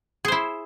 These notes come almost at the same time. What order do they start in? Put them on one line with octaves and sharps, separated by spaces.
G#4 C5 E4